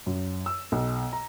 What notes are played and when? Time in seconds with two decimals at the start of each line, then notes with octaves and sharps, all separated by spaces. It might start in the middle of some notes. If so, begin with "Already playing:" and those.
0.06 F#2
0.46 E6
0.72 B1
1.13 A#5